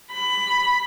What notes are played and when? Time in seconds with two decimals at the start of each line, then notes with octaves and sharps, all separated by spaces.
0.13 B5